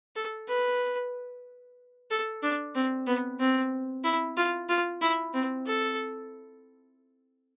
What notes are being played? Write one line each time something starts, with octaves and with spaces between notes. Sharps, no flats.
A4
B4
A4
D4
C4
B3
C4
E4
F4
F4
E4
C4
A4